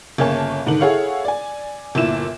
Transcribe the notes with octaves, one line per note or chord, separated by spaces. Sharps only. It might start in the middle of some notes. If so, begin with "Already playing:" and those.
G1 C#3 A#3 C#5 G#5 A5
G#2 D3 D#3 D#4 F#7
E4 G#4 A4 C#5 F5 F#5
D5 G#5
G1 A#2 E4 E7